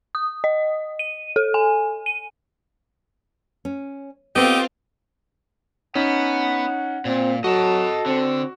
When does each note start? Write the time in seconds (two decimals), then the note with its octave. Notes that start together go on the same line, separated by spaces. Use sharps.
0.15 D#6
0.44 D#5
0.99 D#7
1.36 A4
1.54 G#5
2.06 D#7
3.65 C#4
4.36 B3 C4 F4 G4 A4 D#5
5.95 B3 C#4 D#4 F#5
7.05 A#2 C4
7.44 F#3 F#4 A4 D#5 A5
8.06 D3 C4